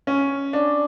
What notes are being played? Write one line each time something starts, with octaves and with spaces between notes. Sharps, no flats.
C#4
D4